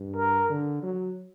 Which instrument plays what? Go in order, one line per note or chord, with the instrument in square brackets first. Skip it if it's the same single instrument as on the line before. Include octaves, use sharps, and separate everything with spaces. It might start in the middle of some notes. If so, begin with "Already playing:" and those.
Already playing: [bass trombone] G2
[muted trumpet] A#4
[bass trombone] D3
F#3